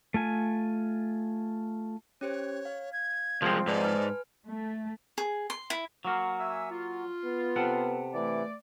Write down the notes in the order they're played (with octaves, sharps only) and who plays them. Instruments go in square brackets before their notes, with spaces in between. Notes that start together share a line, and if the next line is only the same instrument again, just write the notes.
[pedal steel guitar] A3 F4 G#5
[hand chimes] C#4 G4 C5 [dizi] C#5
[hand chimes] F5
[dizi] G#6
[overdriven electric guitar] C2 G#3 [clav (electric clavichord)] F3 C4
[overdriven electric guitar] G#2 [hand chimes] B4 A5 C6 [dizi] D5
[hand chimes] B4 G#5 F6
[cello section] A3
[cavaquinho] G#4
C6
E4
[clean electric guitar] F#3 A#3 F#4 [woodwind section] F5
[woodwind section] E5 G#5 E6
F4
[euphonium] B3
[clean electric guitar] C3 A4 F#5
[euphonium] E3 [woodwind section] A3 D5